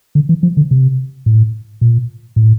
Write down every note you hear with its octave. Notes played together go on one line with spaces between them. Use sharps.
D3
E3
F3
D3
C3
A2
A#2
A2